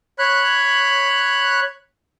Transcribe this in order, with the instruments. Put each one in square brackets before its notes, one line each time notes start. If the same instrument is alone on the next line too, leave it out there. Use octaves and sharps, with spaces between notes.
[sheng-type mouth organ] C#5 B5 F#6